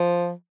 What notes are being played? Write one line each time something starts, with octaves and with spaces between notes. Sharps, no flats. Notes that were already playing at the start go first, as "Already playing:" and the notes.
Already playing: F3